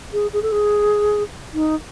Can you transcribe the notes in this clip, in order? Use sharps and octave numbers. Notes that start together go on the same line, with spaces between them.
G#4
G#4
A4
G#4
D#4